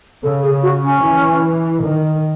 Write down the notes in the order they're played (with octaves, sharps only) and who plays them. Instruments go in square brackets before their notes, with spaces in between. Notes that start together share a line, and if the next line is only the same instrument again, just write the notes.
[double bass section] C#3 [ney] A4
[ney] G#4
F#4
C#4
[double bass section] E3
D#3